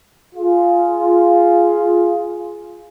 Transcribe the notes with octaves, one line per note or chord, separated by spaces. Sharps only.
F4 G#4